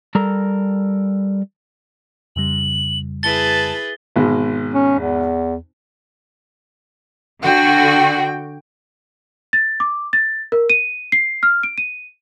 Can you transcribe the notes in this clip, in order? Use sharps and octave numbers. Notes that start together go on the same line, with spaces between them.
G3 A4 A#4 A#5
F2 C#3 G3 F#7
E4 G#4 B4 A5 A6 G7
G#1 B2 G#3
C#4
E2
D3 F#4 G5
A6
D6
A6
A#4
D#7
C7
F6
D7
D#7